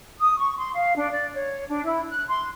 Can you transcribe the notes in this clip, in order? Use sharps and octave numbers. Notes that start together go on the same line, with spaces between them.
D#6
C#6
C6
F5
D4
D5
C#5
D4
E4
F#6
C6